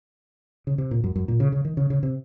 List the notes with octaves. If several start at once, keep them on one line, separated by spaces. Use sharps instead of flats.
C#3
C3
A#2
F#2
F#2
A#2
C#3
C#3
D#3
C#3
C#3
C3